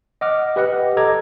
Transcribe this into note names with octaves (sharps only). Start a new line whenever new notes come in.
D#5 F#5 D6 F6
G4 B4 D#5 F#5
A4 D#5 A#5 D6 G#6